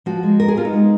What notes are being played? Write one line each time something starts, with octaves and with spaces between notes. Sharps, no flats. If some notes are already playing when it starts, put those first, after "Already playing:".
F3 F#4
G#3
B3 A#4
G#4
B3 F4
D#4
G#3